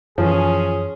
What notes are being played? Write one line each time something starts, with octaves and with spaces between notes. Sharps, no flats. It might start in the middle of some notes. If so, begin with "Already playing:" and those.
F#2 E3 F3 C#4 G#4 C6